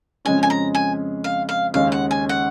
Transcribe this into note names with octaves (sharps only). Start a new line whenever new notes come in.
F2 C#3 G#3 C#4 G#5
G#5
A#5
G#5
F5
F5
D#2 C#3 G#3 F5
F#5
G#5
F#5